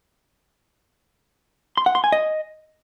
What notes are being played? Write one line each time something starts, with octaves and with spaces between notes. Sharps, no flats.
C6
F#5
C6
G#5
D#5